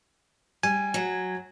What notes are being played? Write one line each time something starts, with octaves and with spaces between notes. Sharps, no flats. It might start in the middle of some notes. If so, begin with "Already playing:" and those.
G3 G#5
F#3